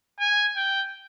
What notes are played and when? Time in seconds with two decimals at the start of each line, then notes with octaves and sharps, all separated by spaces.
0.20 G#5
0.56 G5